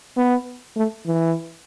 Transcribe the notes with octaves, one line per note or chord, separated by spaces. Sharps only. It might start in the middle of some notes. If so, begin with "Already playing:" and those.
B3
A3
E3